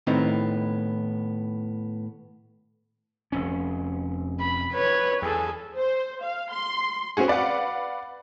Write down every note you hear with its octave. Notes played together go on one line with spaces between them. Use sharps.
A2 D#3 B3 C4 D#4
F1 F2 C#4
B5
B4 C#5
E2 G#4 A4
C5
F5
C6
C4 C#4 F#4 G#4
B4 D5 F5 F#5